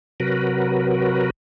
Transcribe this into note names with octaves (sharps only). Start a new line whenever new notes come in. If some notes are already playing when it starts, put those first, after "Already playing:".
C3 F#3 F#4 A#4 B4